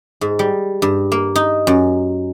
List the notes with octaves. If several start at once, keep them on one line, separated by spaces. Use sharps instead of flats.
G#2
G3
G2
A#3
D#4
F#2